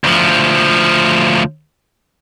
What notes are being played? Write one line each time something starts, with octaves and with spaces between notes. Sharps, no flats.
D2 F3